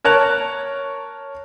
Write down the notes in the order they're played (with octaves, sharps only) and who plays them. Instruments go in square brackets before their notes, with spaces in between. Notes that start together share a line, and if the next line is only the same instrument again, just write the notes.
[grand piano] A#4 C#5 A5 F#6